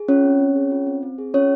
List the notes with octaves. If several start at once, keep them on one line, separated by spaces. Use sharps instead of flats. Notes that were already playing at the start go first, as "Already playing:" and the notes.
Already playing: G#4
C#4 F4 C#5
C4
C4
G#4
F4
C4
C4
G#4
C#4 F4 C#5